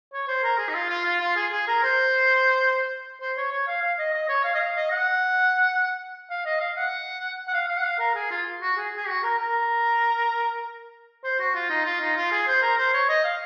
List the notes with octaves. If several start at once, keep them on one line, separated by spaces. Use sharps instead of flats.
C#5
C5
A#4
G#4
D#4
F4
F4
F4
F4
G#4
G#4
A#4
C5
C5
C#5
C#5
F5
F5
D#5
D#5
C#5
F5
D#5
F5
D#5
F#5
F5
D#5
F5
F#5
F#5
F5
F5
F#5
F5
A#4
G#4
F4
F#4
G#4
G#4
F#4
A#4
A#4
C5
F#4
F4
D#4
F4
D#4
F4
G#4
C5
A#4
C5
C#5
D#5
F5